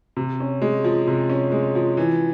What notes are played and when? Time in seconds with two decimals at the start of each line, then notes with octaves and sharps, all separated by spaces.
0.17 C3
0.40 C#4
0.62 G#3
0.84 F3
1.07 C3
1.30 C#4
1.52 G#3
1.75 F3
1.97 E3